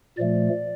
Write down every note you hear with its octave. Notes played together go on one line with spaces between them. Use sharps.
A#2 F3 A3 D5